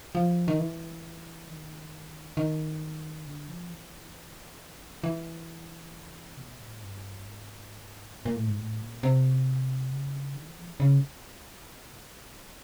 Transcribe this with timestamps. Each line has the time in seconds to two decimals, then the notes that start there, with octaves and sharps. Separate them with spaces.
0.15 F3
0.48 D#3
0.59 E3
1.49 D#3
2.37 D#3
3.25 D3
3.48 F3
3.70 E3
5.04 E3
6.37 B2
6.58 A2
6.81 G2
7.25 G#2
8.14 A2
8.25 A#2
8.36 A2
8.47 G#2
8.59 A2
8.81 A#2
9.03 C3
9.91 C#3
10.36 D#3
10.47 E3
10.58 F3
10.69 E3
10.80 C#3